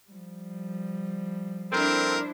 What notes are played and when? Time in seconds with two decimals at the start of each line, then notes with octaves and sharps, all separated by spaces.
0.10 F3 G3
1.72 C4 D4 E4 A4 A#4 C5